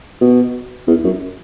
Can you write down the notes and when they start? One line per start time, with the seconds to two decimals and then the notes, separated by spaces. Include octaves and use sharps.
0.21 B2
0.87 E2
1.04 F#2